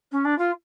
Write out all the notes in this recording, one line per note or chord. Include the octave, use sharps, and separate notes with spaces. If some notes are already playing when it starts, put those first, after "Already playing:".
C#4
D4
F4